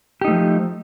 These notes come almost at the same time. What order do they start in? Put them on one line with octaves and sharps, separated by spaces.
G4 D#4 A3 F3